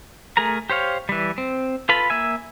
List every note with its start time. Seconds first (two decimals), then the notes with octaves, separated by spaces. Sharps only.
0.37 A3 G#4 A#4 A#5
0.70 G4 C5 C#5 F5
1.09 E3 G3
1.38 C4
1.89 F4 A4 B4 B5
2.10 A#3 E5 G#5